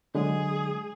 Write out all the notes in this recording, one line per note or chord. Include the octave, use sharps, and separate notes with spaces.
D3 F#3 G#3 G#4